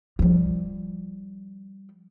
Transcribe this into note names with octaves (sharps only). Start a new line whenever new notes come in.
F3 G3